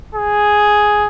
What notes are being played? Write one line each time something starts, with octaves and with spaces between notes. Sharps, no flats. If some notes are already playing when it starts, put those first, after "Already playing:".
G#4